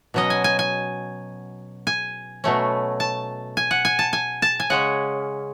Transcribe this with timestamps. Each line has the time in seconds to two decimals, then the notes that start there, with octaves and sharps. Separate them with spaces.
0.14 B2 F#3 C#4 D#5
0.30 G#5
0.44 G#5
0.59 G#5
1.87 G#5
2.44 B2 F#3 A3 C#4
3.00 A5
3.57 G#5
3.71 F#5
3.85 G#5
3.99 A5
4.13 G#5
4.42 A5
4.60 G#5
4.70 C#3 G#3 C#4 F#5